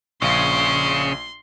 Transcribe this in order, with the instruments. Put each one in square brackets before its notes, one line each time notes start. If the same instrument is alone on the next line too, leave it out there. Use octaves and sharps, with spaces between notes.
[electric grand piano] A#1 F5 [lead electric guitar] C#3 [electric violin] C6